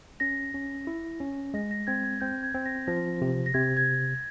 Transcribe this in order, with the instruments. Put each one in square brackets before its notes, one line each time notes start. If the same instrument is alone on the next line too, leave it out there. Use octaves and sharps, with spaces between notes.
[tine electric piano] C#4 [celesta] A#6
[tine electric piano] C#4
E4
C#4
[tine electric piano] G#3 [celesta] A#6
[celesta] A#6
[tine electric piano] C4 [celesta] G#6
[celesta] G#6
[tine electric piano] C4 [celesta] G6
[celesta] G#6
[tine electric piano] C4
[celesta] A#6
[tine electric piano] F3 [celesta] A#6
[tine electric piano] C3
[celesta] A#6
[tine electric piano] C3 [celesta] G#6
[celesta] G#6